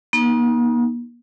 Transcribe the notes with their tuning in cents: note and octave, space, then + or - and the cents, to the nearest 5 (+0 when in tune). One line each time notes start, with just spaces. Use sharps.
A#3 +45 D#4 +0